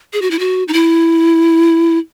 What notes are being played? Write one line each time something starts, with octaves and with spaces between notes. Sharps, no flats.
G#4
F#4
E4
F#4
D#4
E4